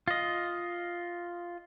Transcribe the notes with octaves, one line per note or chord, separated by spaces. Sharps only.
F4 D#5